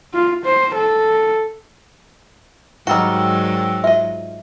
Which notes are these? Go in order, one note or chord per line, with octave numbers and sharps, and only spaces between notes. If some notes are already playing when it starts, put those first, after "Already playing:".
F4
C5
A4
G#2 D#3 F#3 G3 F#4 G5 E6
F4 D#5 E5